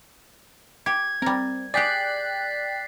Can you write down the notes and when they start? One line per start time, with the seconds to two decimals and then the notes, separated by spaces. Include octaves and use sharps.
0.86 G4 G#6
1.22 G3 C4 A#4
1.74 G4 G#4 D5 G5 F#6 A6 B6 C7